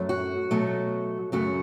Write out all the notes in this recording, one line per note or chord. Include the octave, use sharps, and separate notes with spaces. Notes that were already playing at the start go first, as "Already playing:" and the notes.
Already playing: F#2 F#3 A3
F#4
B2 F#3 A3
F#2 C#3 F#3 A3 F#4